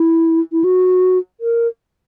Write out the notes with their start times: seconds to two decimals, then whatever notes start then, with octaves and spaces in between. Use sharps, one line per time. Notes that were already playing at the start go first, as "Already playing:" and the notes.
Already playing: E4
0.52 E4
0.64 F#4
1.41 A#4